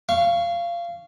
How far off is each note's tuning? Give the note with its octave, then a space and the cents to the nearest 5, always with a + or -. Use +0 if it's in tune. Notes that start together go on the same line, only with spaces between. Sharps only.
F5 -20 C#6 +0